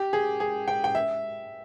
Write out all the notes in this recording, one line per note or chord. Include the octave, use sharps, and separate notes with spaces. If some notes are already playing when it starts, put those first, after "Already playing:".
Already playing: G4
G#4
G#4
G5
G5
E5